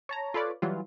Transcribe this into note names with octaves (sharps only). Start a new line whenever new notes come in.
C#5 A5 A#5
F4 A4 B4 C#5 D5
E3 F#3 G3 F4